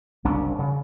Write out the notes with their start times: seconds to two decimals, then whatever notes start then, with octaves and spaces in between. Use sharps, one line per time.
0.24 F#1 C2 C#4 D4
0.59 C#3